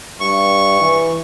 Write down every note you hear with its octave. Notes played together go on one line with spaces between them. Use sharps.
G2 C#6
E3